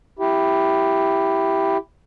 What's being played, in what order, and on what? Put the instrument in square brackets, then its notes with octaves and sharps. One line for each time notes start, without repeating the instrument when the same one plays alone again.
[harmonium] E4 G4